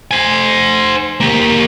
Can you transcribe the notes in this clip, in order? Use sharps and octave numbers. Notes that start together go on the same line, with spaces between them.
C5 G#5
A#3 G4